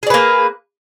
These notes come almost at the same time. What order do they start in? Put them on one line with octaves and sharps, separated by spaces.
G#4 D5 B4 A#3